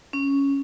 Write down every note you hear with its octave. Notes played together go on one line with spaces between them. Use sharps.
C#4